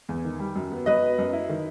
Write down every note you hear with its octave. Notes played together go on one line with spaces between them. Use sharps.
E2
D#3
G3
F#2
B3
F#3 B4 D#5
B3
F#2
E4
D#3